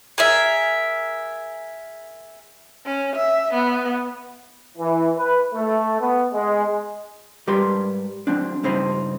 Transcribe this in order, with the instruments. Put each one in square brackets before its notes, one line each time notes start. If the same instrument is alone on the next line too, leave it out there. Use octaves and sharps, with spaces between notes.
[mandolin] G#4 A#4 E5
[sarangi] C#4
E5
B3
[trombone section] E3
B4
A3
B3
G#3
[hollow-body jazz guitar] G#2 G3 G4 A#4 B4 C6
F#3 C4 D4
C#2 G2 C4 D#4 C5 B5